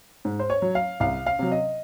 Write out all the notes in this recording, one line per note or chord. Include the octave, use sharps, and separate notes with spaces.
G#2
C5
C#5
F#3
F5
C2 F5
F5
C3 F#3
D#5